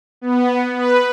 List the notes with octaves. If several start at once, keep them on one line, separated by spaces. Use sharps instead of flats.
B3
B4